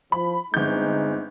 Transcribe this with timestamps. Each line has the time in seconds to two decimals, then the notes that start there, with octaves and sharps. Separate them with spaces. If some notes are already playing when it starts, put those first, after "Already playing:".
0.12 F3 B5
0.54 G1 G#3 C4 D#4 G6